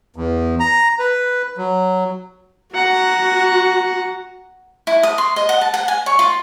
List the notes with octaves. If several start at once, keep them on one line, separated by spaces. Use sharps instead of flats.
E2
A#5
B4
F#3
F#4 F#5 A#5
E4
D#6
C6
D#5
F#5
A5
F#5
G#5
C#5
F4